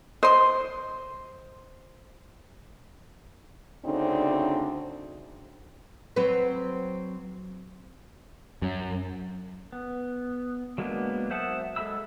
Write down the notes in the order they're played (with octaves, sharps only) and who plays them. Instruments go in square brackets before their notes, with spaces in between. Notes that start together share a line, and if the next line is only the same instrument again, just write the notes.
[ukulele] C5 [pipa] D#5 C6
[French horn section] D2 C#3 C4 D4 D#4
[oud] F#3 C4 B4
[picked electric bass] F#2
[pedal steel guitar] B3
F#3 G#3 A#3 B3 D4
C5 E5 F#5 A5 D#6
G#3 A4 E5 B5 E6